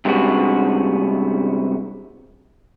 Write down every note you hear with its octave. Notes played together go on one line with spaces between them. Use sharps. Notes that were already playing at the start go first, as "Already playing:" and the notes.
G2 C3 G#3 B3 C#4 F#4